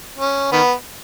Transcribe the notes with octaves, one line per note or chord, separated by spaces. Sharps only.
C#4
D#3 B3